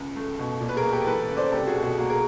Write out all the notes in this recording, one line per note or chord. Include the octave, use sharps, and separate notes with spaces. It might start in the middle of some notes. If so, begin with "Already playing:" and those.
Already playing: C#2
A3
B2
A#2
B4
G#4 A#4
A#3
G4 A4
E3 A4 B4
C#2
C5 D5
C2 G4 A4
F#4 G#4
B2
F#4 G#4
A#3 F#4 G#4
G#4 A#4